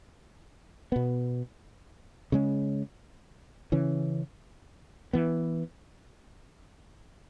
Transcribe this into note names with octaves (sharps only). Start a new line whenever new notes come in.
B2 B3
C#3 G#3 C#4
C#3 E3 C#4
E3 B3